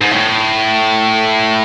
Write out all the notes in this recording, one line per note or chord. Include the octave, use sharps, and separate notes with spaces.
G#2
A2